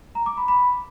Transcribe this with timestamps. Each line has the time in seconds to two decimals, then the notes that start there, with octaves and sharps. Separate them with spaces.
0.15 A#5
0.26 D6
0.37 B5
0.48 B5